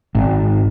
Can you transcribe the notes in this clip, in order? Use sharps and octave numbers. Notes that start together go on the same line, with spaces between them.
G#1